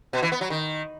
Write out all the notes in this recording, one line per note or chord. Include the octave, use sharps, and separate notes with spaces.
B2
E3
B3
F#3
D#3